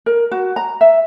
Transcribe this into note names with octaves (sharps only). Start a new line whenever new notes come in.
A#4
F#4
A#5
E5